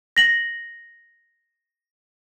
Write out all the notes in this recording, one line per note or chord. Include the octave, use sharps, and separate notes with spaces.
A#6 F#7